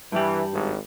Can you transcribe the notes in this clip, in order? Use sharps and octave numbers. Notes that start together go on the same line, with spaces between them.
G2 E3 G3
G#1